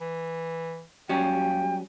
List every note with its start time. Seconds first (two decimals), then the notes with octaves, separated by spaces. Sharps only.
0.01 E3
1.09 D#2 F#3 G3 C#4 G5